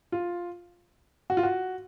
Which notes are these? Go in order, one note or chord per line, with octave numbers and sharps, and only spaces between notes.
F4
F#4
F4
F#4